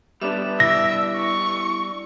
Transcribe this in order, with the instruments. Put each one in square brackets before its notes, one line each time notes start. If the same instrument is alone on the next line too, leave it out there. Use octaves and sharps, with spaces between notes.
[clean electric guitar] G3 B3 D4 [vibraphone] E5 D6
[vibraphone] E4 D5 [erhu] E5 [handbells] A#6
[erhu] C#6